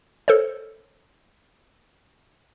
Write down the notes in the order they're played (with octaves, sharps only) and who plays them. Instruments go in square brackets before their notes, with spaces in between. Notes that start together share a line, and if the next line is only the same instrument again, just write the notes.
[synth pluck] A4 A#4 C5 C#5